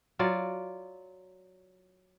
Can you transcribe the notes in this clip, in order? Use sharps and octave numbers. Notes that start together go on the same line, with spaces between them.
F#3 F4 D5